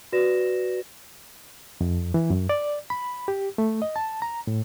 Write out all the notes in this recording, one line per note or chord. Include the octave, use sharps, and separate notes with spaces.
F#4 B4 D5 A#6 E7
F2
E3
F#2
D5
B5
G4
A3
D#5
A5
A#5
A2